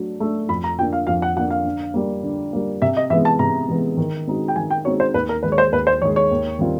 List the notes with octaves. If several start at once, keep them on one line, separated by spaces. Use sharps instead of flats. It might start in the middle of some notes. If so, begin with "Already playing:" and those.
Already playing: F#3 A3 D4
A3 D4
F2 B5
A#5
D3 F3 A#3 D4 G5
F5
F2 F5
F#5
D3 F3 A#3 D4 F#5
F5
D3
G3 A#3
D3
G3 A#3
C3 E5
D#5
E3 G#3 B3 E5
A5
C3 A#5
E3 G#3 B3
D#3
G#3 C4 D#4 F#4
G5
D#3 G#5
G5
G#3 C4 D#4 F#4 C#5
C5
D#2 B4
A#4
D#3 G#3 B4
C#5
C5
D#2 B4
C5
D#3 G#3 C#5
C#5
D#2
D#3 G3 C4 F4